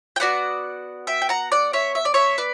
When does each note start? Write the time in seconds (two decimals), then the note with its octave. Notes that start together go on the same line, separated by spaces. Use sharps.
0.16 G5
0.20 B3 F#4 D5 F#5
1.07 E5 G5
1.22 G5
1.29 F#5 A#5
1.52 D5 F#5
1.73 C#5 E5
1.95 E5
2.05 D5
2.14 C#5 E5
2.38 B4 D5